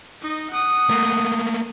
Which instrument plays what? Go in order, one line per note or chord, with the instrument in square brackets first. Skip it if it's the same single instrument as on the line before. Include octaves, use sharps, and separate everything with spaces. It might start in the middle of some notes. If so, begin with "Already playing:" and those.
[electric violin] D#4 D#5
F#5 D#6
[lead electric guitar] A3 A#3